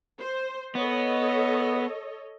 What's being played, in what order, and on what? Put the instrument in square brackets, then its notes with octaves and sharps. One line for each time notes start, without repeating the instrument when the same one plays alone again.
[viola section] C5
[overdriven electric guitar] B3 [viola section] A4 C#5 D#5